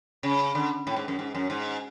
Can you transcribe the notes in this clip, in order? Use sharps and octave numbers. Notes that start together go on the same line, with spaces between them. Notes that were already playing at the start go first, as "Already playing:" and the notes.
C#3
D3
A2
G#2
F#2
G#2
F#2
G#2